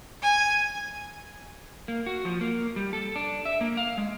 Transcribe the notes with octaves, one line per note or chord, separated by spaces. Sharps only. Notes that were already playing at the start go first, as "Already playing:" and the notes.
G#5
A#3
F#4
F3
A#3
G3
A4
D4
E5
A#3
F5
G#3